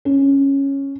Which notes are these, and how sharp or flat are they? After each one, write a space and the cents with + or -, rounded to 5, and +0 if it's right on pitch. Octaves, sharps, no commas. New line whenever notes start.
C#4 -5